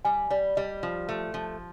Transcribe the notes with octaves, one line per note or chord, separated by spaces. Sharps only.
G3 G#5
G3 D5
G3 D#5
F3
A3
F3